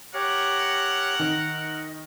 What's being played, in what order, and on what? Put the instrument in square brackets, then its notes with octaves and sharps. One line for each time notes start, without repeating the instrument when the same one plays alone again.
[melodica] G4 C#5 [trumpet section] A#4 F#5
[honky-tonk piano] D#3 [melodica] D#5